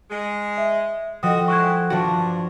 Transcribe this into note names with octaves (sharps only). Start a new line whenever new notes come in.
G#3
E5
F3 F#4 A4 D#5 F#5 G5 D#6
G#3 E4 C#6 F#6 G#6
G2 F3 D4 F#4 F5 A5